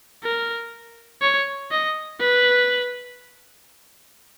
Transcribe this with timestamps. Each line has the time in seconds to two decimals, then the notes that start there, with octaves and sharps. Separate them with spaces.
0.23 A#4
1.22 C#5
1.71 D#5
2.20 B4